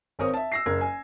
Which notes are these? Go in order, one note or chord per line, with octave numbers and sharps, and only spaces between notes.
G#1 C4 A#4 C#5 D#6
E5 A5
E6 A#6 C7
F#1 A#4 G#6
G#5